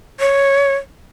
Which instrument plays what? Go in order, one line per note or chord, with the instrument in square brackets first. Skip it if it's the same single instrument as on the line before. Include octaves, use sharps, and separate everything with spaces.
[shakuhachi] C#5